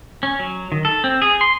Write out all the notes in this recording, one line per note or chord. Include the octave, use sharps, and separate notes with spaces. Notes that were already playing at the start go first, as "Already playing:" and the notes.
C#4
F#3
D#3
A4
C4
G#4
C6